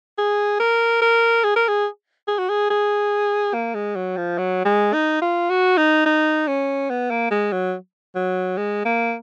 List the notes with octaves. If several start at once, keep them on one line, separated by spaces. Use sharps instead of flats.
G#4
A#4
A#4
G#4
A#4
G#4
G#4
F#4
G#4
G#4
A#3
G#3
F#3
F3
F#3
G#3
D#4
F4
F#4
D#4
D#4
C#4
B3
A#3
G#3
F#3
F#3
G#3
A#3